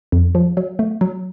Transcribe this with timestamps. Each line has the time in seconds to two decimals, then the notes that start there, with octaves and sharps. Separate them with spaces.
0.12 F2
0.35 F3
0.57 F#3
0.79 A3
1.01 F#3